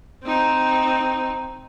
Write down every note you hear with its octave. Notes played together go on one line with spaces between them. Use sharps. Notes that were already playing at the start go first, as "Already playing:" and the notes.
C4 D#4